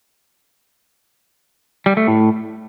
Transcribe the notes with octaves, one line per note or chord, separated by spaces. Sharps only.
G3
A3
A2